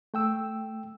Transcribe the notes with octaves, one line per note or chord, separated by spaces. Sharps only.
A3 G5 E6